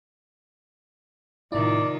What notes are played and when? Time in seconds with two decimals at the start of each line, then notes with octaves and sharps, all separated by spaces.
1.52 A2 C3 D#3 E4 F4 D5